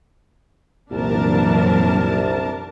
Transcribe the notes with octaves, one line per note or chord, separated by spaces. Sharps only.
C2 F#2 A#2 E3 D4 A#4 A5